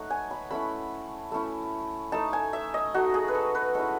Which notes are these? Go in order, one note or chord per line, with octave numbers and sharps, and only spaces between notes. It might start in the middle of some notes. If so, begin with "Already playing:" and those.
Already playing: A3 D#4 C#5 F#5
G#5
B5
A3 C#4 E4 B5
A3 C#4 E4
A3 D#4 A5
G#5
E5
D#5
A3 D#4 F#4
G#4
B4
A4
B4
G#3 C#4 E4 A4